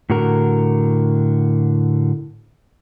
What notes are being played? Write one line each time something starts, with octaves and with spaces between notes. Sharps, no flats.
A2 D3 F#4 A#4